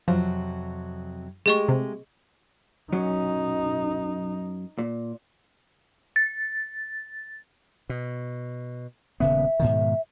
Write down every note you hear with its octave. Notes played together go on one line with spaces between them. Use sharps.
F2 C3 F3 F#3
G#3 A3 G4 G#4 D#5 C#6
C3
F#2 F#3 C#4 D#4
A#2
A6
B2
D#1 C#3 B3 E5
G#2 B2 D#3